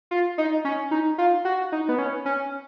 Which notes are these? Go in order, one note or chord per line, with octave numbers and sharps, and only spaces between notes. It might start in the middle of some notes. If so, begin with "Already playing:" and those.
F4
D#4
C#4
D#4
F4
F#4
D#4
B3
C#4
C#4